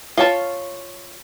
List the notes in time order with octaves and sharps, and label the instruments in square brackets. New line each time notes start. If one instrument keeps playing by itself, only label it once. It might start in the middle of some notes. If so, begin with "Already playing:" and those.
[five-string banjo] F4 C#5 A5